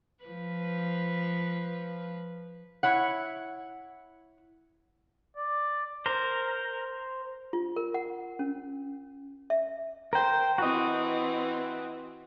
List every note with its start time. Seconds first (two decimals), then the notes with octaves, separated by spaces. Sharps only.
0.24 F3 B4
2.83 E4 C#5 F#5
5.37 D5
6.06 A#4 C5
7.53 F4
7.76 A#4
7.94 F#5
8.39 C#4
9.50 E5
10.13 A#4 C5 G5
10.58 E3 C4 F#4 D#5